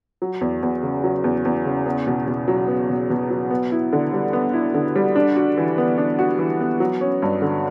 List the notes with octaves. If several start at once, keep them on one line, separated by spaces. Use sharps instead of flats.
F#3
E2
E2
C#3
F#3
E2
E2
C#3
B3
B2
B2
F#3
B3
B2
B2
F#3
B3
E4
D3
G3
B3
E4
D3
G3
D4
F#4
E3
B3
D4
F#4
E3
B3
F#3
C#4
G2
D3